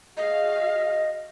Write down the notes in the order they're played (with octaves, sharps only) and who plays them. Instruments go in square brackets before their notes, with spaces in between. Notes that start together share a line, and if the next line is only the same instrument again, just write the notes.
[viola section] F#4 G#4 F5 [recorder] D#5